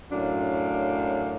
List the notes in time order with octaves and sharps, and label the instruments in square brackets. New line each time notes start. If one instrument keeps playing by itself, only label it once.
[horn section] F#2 A2 D4 F5